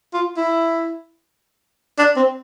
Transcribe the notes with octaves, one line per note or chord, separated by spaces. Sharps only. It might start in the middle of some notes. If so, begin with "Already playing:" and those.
F4
E4
D4
C4